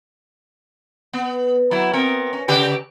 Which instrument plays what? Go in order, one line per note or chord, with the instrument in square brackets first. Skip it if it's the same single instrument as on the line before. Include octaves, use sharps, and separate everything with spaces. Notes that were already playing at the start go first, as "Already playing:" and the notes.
[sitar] B3
F#3 E4
B3 C4 A#4
C#4
C#3 G4 B4